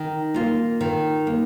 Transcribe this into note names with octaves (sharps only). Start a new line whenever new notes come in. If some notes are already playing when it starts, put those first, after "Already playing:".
Already playing: D#3
A#3 F4
D#3
A#3